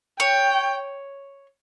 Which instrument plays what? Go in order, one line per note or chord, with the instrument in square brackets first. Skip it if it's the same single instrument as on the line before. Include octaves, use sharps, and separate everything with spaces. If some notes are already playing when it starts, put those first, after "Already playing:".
[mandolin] C#5 [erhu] G5